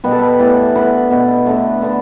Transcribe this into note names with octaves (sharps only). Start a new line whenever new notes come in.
B2 G3 B3 B4
A4
B4
A2 E3 B3 D5
D3 B3 B4
B2 B3
D3 A3
D3 B3